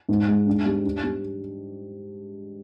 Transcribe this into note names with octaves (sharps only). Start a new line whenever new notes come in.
G#2
G#3
D4
G3
D4
G3